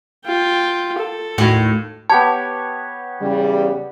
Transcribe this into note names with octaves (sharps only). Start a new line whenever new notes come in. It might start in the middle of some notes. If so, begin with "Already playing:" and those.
F4 G5
A4
D#2 A2 F#4
B3 G4 C#5 A5
E2 C#3 G3